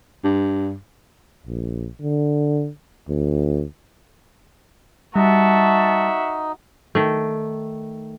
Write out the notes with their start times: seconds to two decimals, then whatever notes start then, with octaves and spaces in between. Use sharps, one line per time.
0.24 G2
1.47 A#1
2.01 D3
3.09 D2
5.16 G3 D#4 F#4 E5 A5
6.95 D#3 A3